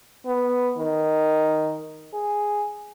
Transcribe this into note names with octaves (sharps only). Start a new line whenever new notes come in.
B3
D#3
G#4